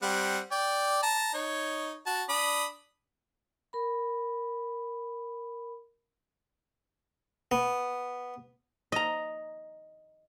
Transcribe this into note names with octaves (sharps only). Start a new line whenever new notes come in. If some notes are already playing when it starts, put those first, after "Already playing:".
G3 C4 F#5
D5 G5
A5 A#5
D#4 C#5
F#4 A5
D4 B5 D#6
A#4 B5
B3
D#5 A#5